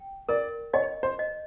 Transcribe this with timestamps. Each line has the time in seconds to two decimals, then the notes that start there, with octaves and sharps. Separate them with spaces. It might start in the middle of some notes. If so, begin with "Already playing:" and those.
Already playing: G5
0.29 A#4 D5
0.73 C#5 D#5
1.03 C5
1.19 D#5